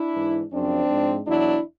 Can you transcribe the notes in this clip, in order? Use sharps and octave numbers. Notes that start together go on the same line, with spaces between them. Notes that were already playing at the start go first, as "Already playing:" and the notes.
Already playing: D4 E4
G#2 E3
F#2 C#3 F3 C4 D4
G#2 F3
E2 B2 F#3 D4 E4